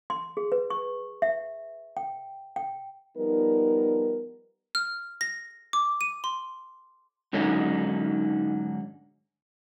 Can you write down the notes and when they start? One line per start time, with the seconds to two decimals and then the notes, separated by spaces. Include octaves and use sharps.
0.10 C6
0.37 G#4
0.52 B4
0.70 C#6
1.22 E5
1.97 G5
2.56 G5
3.17 F3 G3 B3 D#4 A#4
4.75 F6
5.21 A#6
5.73 D6
6.01 D#7
6.24 C6
7.33 G#2 D3 F#3 C#4 D#4